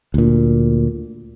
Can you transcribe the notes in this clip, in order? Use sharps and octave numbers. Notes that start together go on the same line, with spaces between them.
D2 A#2